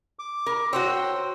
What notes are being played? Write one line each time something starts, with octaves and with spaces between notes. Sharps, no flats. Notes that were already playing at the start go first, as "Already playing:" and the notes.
D6
A#4
F#4 C5 C#5 G5 C6 E6